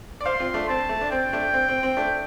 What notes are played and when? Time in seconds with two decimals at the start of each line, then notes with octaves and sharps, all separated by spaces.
0.21 D5
0.25 C5 F5 C6
0.40 C4 F4
0.54 A3 D4
0.69 C4 A5
0.89 A3
1.01 D4
1.11 C4 G5
1.33 A3 D4
1.54 C4
1.68 C4
1.83 C4
1.97 A3 D4